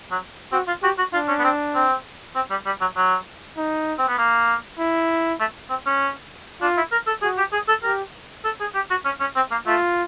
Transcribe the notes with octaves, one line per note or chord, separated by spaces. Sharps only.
F#3
C4 F#4
F4
F#4 G4
F#4
D4 F4
C#4
B3
C4
C4
C4
G3
G3
F#3
F#3
D#4
C4
B3
A#3
E4
A3
C4
C#4
D4 F4
E4
A#4
A4
F#4 G#4
G4
G#4
A4
G4 A#4
A4
G#4
G4
F#4
C#4
C#4
C4
A#3
A3 F4